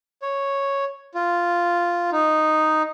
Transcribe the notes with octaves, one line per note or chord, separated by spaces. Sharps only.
C#5
F4
D#4